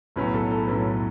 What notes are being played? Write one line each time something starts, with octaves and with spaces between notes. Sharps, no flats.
B1 A2 F#3 C#4 B4
A4
A4
B1 A2 F#3 C#4 B4